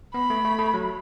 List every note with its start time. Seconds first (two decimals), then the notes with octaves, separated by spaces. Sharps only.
0.14 B3 B5
0.30 A3
0.45 A3
0.59 A3
0.74 F#3